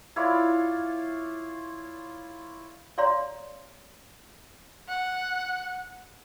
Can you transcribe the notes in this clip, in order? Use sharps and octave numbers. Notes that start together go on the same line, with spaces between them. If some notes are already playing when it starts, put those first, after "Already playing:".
E4 F4 C#5 D5
C#5 D5 F5 A#5 C6
F#5